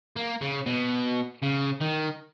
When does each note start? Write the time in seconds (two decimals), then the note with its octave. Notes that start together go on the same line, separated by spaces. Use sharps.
0.16 A#3
0.41 C#3
0.66 B2
1.43 C#3
1.81 D#3